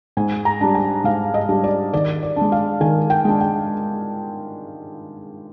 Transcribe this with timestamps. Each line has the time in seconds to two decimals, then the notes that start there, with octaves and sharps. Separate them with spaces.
0.17 G#2 G#5
0.45 A#5
0.61 G3 D4
0.75 G#5
1.04 G#2 F5
1.34 D#5
1.49 G3 D4
1.64 D5
1.93 D#3 D5
2.23 D5
2.36 D4
2.41 G#3
2.52 F5
2.81 D#3 G#5
3.10 G5
3.25 G#3 D4
3.41 G5